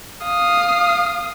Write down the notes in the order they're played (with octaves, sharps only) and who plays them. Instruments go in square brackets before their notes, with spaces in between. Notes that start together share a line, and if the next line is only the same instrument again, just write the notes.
[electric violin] F5 D#6